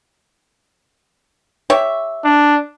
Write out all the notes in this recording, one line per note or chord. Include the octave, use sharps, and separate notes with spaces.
G4 C#5 E5
D4